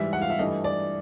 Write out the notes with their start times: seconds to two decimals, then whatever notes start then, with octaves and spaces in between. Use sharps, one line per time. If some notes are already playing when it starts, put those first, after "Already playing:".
Already playing: G#2 E3 G3 E5
0.13 F#5
0.21 F5
0.30 E5
0.39 G2 E3 A3 D#5
0.64 D5